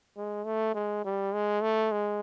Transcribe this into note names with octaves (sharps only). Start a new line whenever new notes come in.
G#3
A3
G#3
G3
G#3
A3
G#3